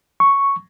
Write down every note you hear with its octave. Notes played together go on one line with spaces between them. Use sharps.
C#6